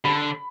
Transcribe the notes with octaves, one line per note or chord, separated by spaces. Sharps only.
D3 B5